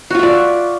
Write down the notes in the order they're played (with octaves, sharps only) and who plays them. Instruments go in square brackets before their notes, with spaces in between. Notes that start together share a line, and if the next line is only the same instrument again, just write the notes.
[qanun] F#4
F4
E5
D5